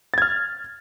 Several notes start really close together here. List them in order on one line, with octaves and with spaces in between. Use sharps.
A6 G#6 F6